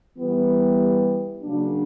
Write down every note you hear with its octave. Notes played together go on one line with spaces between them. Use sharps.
E3 G3 B3
C#3 F#3 A#3 D4